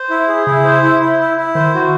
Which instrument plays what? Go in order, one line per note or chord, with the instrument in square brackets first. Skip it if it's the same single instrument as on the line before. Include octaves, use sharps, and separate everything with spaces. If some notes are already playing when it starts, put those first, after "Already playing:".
Already playing: [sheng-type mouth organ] C5
E4
G#4
[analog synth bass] C#3 [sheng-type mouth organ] E4
[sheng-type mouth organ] C5
E4
E4
E4
E4
[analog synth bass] D#3 [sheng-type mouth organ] C5
[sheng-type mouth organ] F#4